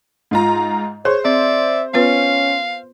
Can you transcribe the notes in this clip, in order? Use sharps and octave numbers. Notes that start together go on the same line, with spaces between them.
G#2 F4 A#5
G#4 C5 C#5
C4 D5 E5
B3 C#4 F4 B4 F5